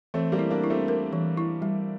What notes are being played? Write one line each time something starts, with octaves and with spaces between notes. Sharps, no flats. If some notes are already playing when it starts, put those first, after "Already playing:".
E3 A3 C4
G3 A#3
E4
A#3 D4
E4
A3 C4
A#4
E3
E4
G3